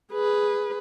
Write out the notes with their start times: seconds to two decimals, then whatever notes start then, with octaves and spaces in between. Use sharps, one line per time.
0.12 G#4 B4